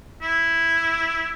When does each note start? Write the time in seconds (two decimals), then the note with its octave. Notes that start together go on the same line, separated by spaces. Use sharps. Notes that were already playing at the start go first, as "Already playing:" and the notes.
0.22 E4